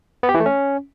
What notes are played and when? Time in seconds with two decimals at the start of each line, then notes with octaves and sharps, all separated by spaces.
0.23 B3
0.29 G4
0.34 E3
0.40 A3
0.46 C#4